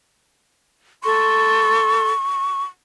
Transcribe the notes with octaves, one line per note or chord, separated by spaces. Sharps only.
A4 C6 C#6